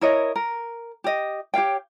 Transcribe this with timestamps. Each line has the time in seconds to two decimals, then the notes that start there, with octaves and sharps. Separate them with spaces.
0.01 E4 A#4 C#5 D#5
0.36 A#4
1.04 G4 D#5
1.54 G4 C#5 F5 G5